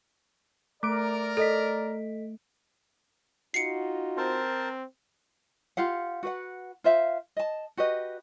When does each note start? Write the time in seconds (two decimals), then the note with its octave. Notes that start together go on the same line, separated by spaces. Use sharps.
0.83 A3 A#4 D5 D6 D7
1.37 A4 D#5 B6
3.54 D#4 F4 F#4 C7 C#7
4.18 C4 A#4 C5 A5
5.77 F4 G4 F5 F#5
6.23 F#4 B4 F#5
6.84 F4 C5 E5 F5
7.37 D#5 A5
7.77 F#4 G4 B4 D#5